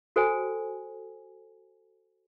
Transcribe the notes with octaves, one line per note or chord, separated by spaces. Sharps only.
F#4 A4 C5 G5 G#5